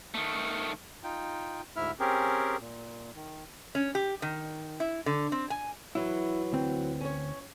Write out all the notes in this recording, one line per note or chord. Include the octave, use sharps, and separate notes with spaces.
D#3 A3
D#4 F4 G5
D2 G#2 E4 E5 F6
C4 C#4 G4 G#4 A#4
A#2
D#3
C#4
G4
D#3
E4
D3
C4
G#5
E3 F#3 E4
D2 C4
C#4 C#5